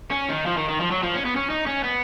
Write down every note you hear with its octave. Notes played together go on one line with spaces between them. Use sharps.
C#4
D#3
F3
D#3
D#3
F3
F#3
F3
C#4
B3
C#4
D#4
C#4
B3